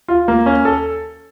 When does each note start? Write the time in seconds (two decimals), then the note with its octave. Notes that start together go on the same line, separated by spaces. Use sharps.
0.08 F4
0.28 A#3
0.46 C#4
0.65 A4